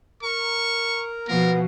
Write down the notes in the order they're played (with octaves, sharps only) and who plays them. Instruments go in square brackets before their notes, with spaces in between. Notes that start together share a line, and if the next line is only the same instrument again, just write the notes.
[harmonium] A#4 A#5 [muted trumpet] C#6
[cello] B2 F3 [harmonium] B3 [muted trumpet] A#4